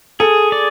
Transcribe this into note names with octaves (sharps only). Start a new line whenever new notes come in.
G#4 A4
D5